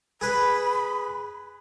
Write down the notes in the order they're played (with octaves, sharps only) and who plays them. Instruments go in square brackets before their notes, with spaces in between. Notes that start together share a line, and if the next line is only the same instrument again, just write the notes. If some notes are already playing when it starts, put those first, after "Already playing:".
[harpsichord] G#4 B4 [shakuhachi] B5